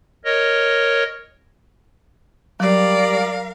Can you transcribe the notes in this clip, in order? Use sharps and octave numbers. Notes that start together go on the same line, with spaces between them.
A#4 C#5 D#5
F#3 G3 A#4 D5 F5